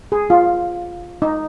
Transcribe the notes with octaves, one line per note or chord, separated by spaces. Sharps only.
G#4
F4
D#4